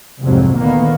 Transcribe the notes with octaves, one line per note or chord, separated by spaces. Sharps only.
C2 F2 G#2 C3 F#3
D2 A#2 D#3 A#3 B3